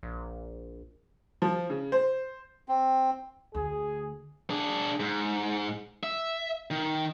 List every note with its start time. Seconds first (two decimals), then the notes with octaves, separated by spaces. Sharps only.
0.03 A#1
1.42 F3
1.70 C#3
1.92 C5
2.68 C4
3.54 D2 G#4
4.50 D4 G#4
5.00 G#2
6.03 E5
6.71 D#3